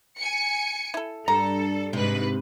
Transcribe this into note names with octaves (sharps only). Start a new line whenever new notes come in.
G#5 C#7
E4 A4
G2 A4 A#5
G#2 C3 B4